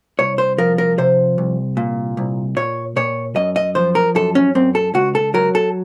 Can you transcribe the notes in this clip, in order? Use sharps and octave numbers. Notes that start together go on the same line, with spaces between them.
C2 C#5
C5
F3 A#4
A#4
C3 C5
C2
A#2
C2
A#2 C#5
A#2 C#5
F#2 D#5
D#5
F3 C5
A#4
F#2 A4
C#4
F#2 C4
A4
C#2 F#4
A4
F#3 A#4
A4